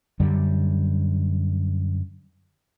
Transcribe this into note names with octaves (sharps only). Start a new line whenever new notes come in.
F#2 D3 G3